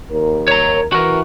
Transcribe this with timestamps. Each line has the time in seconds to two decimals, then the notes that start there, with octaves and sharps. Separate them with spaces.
0.11 D#2 A#4
0.48 C#5 A#5
0.92 E3 F#4 A#4